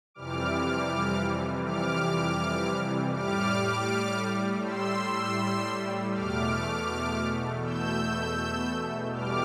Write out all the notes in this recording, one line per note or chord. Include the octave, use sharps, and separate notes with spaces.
F2 C3 E3 G3 D6 F6
D6 F6
A2 G3 D6 F6
C6 E6
E2 B2 A3 D6 F6
E6 G6
E2 B2 G3 D6 F6